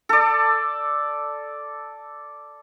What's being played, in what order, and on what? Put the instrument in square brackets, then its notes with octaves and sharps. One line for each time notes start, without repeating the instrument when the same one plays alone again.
[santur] A4 D5